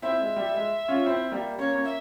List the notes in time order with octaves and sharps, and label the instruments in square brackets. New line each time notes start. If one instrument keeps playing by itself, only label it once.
[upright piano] C4 E4 [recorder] E5
[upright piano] G#3
G3
G#3
C#4 F4
C4 E4
G3 A#3
[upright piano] A#3 C#4 [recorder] C#5
[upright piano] A#3 C#4
[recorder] E5